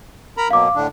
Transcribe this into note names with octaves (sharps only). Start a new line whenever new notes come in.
A#4 A#5 B5
B2 F#3 A#3 F5 D6
A2 D3 D4